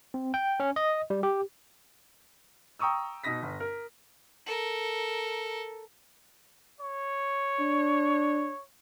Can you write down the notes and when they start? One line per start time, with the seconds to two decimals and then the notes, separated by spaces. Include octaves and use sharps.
0.14 C4
0.34 G5
0.60 C#4
0.76 D#5
1.10 G3
1.23 G4
2.79 G5 A#5 C#6 D#6 E6
3.24 B2 D#4 D#6 A#6 B6
3.43 G1
3.60 A#4
4.46 A4 A#4
6.81 C#5
7.59 D4